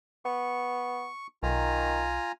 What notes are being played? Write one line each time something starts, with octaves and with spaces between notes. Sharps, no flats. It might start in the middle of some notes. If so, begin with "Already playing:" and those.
B3 C#6
B1 D#3 F4 G#5 A#5